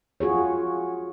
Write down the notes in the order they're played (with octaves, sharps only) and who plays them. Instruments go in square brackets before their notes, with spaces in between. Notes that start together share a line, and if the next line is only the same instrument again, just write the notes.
[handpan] F4 F#4 G#4 C#5